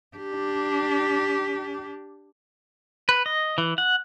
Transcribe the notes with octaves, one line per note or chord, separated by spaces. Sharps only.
D4 G4
B4
D#5
E3
F#5